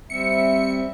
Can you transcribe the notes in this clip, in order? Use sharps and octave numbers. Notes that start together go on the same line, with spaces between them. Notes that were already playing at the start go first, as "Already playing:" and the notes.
G3 C4 E5 C#7